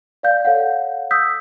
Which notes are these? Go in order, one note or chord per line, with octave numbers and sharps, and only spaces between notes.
D5 F5 G6
A4 C#5 F5 F#5
D#6 E6 G6 B6